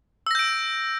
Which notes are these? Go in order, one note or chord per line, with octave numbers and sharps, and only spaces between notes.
E6 G6 A#6 D7